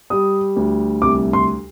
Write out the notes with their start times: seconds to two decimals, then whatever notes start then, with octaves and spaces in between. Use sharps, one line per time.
0.10 G3 D#6
0.56 D2
1.02 C2 D6
1.33 C6